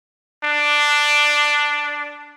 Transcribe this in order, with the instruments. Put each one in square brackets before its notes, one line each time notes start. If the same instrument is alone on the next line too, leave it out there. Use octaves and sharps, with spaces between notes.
[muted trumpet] D4